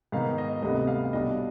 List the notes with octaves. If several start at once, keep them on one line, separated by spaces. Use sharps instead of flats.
G#2 D#3 B3 D#4 F5
D#5
D2 C3 G3 B3 D#5
F5
F5
B1 B2 G3 D4 D#5